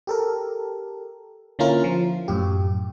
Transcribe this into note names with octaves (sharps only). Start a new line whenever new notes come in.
G4 A4 A#4
D3 A#3 C#4 E4 F4 A#4
F3
F#2 A2 G4